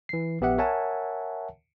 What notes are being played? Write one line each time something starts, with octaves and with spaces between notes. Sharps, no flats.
E3 C7
A#1 B3 G4 E5 F#5
A#4 C#5 E5 F#5 G#5 A5